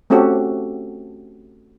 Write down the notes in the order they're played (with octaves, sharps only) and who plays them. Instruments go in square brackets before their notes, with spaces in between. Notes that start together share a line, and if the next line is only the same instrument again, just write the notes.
[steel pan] A3 C4 C#4 F#4 G4 A4